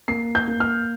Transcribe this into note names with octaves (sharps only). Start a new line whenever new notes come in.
A#3 C7
G6
A#3
F6